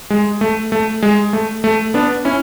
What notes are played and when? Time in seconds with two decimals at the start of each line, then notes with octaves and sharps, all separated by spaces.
0.10 G#3
0.41 A3
0.72 A3
1.03 G#3
1.33 A3
1.64 A3
1.94 B3 D4
2.25 C#4 E4